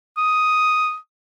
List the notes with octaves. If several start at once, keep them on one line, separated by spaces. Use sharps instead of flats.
D#6